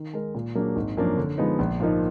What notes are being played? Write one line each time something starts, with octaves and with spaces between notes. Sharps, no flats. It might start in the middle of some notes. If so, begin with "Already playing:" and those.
Already playing: D#3
G#3 D#4 A#4
A#2
F#3 A#3 D4 G#4
G#1
F#2 F3 A#3 D4
D3
F3 G#3 B3 D#4
A#1
G#2 F3 A#3 D#4